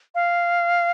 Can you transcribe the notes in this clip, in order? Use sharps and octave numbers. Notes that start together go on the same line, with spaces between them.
F5